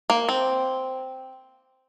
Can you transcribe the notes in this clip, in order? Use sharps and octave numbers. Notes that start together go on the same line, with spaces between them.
A#3
C4